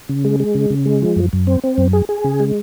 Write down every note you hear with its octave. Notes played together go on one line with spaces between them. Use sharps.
C#3
G#3
G#3
C#3
C#3
G#3
F3
F#2
F#2
C4
C4
F#2
G#4
G#4
C#3
G#3